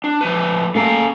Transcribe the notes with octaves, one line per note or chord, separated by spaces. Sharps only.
D4
F3 A3 B4
A3 A#3 C#4 A4 F5 A#5